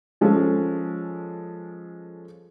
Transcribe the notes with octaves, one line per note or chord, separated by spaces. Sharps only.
F3 G#3 C#4 A4